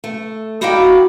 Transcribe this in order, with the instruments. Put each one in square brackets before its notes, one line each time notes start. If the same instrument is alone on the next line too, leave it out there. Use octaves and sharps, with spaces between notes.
[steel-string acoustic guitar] A3
D#4 E4 F#4 D5 F5 G5